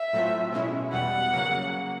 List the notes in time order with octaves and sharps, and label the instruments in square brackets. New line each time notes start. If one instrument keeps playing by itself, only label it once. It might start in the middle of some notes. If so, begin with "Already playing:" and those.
Already playing: [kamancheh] E5
[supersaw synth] A2 F#3 A3 C4 F4
B2 G#3 C#4 E4
[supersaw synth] E2 B2 G3 [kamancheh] F#5
[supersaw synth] C#3 F#3 A#3